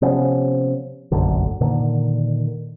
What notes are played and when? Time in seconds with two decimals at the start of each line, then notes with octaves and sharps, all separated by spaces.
0.02 C3 F3 B3 C#4
1.12 F1 A#1 F#2 D3
1.61 A#2 D3 D#3